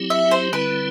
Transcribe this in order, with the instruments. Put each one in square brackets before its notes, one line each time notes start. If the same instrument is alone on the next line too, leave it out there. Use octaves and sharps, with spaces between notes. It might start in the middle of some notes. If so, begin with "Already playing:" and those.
Already playing: [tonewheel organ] F#3 C4 E4 G4
[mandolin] E5
C5
[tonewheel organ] D3 G3 C4 E4 [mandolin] B4